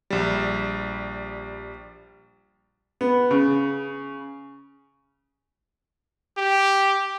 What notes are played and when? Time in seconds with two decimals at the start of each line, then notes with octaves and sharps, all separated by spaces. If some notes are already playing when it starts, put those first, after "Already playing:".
0.10 A#1 G3
3.01 B3
3.31 C#3
6.37 G4